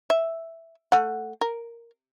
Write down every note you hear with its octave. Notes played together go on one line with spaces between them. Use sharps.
E5
A3 F#5
A#4